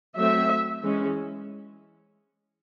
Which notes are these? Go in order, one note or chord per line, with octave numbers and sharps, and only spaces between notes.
F#3 A3 C4 E5
E3 G#3 C#4